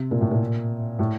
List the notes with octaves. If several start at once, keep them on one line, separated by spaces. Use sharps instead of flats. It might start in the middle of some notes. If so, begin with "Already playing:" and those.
Already playing: C3
A#2
A2
A#2
A2